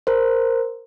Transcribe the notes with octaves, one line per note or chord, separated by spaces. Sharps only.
A#4 C5